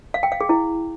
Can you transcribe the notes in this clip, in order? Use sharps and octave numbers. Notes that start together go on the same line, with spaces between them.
F5
G5
F5
G#4
E4